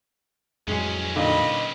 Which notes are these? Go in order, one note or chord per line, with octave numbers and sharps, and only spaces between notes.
B1 F2 A2 F#3 G#3 C#4 G#4
A#2 D3 D#3 D#5 B5